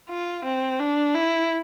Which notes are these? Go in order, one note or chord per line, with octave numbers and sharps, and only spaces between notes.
F4
C4
D4
E4